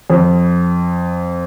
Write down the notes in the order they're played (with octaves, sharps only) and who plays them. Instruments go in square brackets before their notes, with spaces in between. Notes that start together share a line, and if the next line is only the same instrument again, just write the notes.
[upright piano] F2